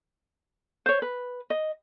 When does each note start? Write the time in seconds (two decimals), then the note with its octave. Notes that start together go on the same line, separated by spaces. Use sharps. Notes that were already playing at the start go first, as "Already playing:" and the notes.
0.86 C5 C#5
1.02 B4
1.50 D#5